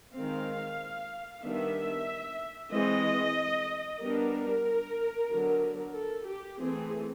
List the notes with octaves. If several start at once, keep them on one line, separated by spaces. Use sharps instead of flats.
D#3 G#3 C4 F5
D#3 G3 B3 D4 E5
E3 G#3 C4 D#5
G3 B3 D4 A#4
D3 F#3 B3
A4
G4
E3 A3 C4 G#4